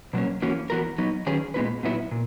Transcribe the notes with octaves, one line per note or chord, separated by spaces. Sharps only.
B2 F#3 A#3 C#4
E3 A#3 C#4 F#4
E3 B3 F#4 A#4
F#3 B3 D#4
D#3 F#3 C#4 G#4 B4
A#2 G#3 B3 E4 B4
A#2 F#3 B3 E4
A#2